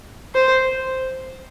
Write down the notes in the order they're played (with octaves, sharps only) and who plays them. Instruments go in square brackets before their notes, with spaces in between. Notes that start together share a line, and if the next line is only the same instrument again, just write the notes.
[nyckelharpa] C5